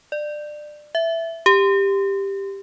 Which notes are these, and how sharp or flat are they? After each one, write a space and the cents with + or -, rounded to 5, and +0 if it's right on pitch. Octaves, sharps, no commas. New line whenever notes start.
D5 +25
E5 +5
G4 +10